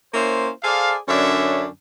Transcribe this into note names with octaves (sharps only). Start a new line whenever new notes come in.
A#3 C#4 E4 C5
G#4 A4 C5 D5 F5
F#2 D3 C#4 D4 C#5 E5